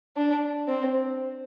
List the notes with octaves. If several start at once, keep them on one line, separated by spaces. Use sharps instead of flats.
D4
C4